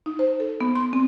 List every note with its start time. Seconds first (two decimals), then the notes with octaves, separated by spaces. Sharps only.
0.06 D#4
0.19 C5
0.40 A4
0.61 B3
0.75 C6
0.93 C4